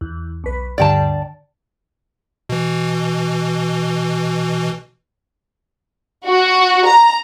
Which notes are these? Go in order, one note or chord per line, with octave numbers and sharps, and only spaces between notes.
E2
B1 B4
D2 G2 D3 D5 G5 A5
B2 E3
F#4
A#5